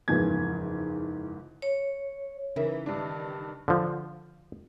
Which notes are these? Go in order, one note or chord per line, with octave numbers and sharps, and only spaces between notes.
F#1 E2 G#2 F3 G#6
C#5
C#3 E3 D#4 A#4 E5
G2 D#3 D4
D3 F3